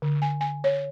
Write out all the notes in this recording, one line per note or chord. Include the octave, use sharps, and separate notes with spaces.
D3
G#5
G#5
C#5